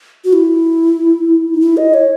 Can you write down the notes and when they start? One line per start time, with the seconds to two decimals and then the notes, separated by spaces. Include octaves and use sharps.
0.25 F#4
0.33 E4
1.54 D#4
1.61 E4
1.77 D#5
1.94 C#5